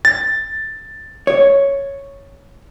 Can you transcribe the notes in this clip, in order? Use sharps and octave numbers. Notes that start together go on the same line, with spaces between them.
A6
C#5